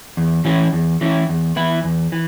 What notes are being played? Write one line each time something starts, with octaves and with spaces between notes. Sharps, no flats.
E2
E3 C#4 E4
E2
E3 C#4 E4
E2
E3 B3 E4
E2
E3